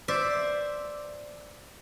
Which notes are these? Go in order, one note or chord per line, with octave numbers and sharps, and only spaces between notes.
C5 D5 E5